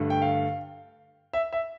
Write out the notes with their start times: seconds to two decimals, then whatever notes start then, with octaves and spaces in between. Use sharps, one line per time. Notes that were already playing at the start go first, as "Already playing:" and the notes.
Already playing: G2 D3 A3
0.10 G5
0.22 F5
1.33 E5
1.53 E5